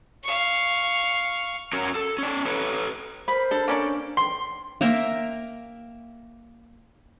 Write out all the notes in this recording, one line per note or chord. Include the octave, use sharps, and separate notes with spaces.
F5 C#6
C#4 F#4 A#4 C#5
A4
C#4 D5
A4 B4 C#5
C4 A#4 C5 B5
D4 A4
A#3 C#4 D5
C6
A#3 A#4 E5 G5